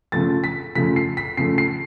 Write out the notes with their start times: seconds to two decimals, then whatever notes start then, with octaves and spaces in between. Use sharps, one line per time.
0.12 C#3 F3 A3 A6
0.44 B6
0.75 C#3 F3 A3 B6
0.96 C7
1.17 B6
1.37 C#3 F3 A3 C7
1.58 C7